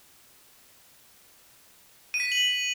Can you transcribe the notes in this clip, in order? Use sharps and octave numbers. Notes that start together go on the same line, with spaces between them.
D#7
B6
D#7
F#7